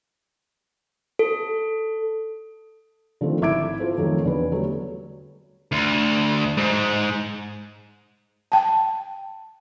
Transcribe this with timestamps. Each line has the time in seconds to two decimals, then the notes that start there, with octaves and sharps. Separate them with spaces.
1.19 A4
3.21 D3 D#3 F3 A3 C4
3.41 G#1 E4 E5 D6 G#6 D7
3.80 F4 F#4 A4 C5
3.98 F2 D#3 F3 F#3 A3
4.24 E2 D3 B4
4.52 F#3 G3 A3
5.72 D2
6.57 G#2
8.52 G5 A5